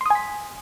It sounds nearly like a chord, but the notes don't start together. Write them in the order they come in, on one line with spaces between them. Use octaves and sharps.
C6 D#6 G#5 B6